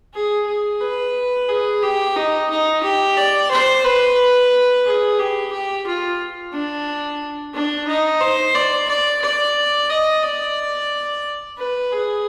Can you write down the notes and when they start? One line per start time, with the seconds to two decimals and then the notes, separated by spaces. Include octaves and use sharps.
0.14 G#4
0.47 G#4
0.81 B4
1.49 G#4
1.83 G4
2.16 D#4
2.50 D#4
2.83 G4
3.17 D5
3.51 C5
3.85 B4
4.85 G#4
5.19 G4
5.52 G4
5.87 F4
6.53 D4
7.54 D4
7.87 D#4
8.21 C5
8.55 D5
8.89 D5
9.22 D5
9.90 D#5
10.23 D5
11.58 B4
11.92 G#4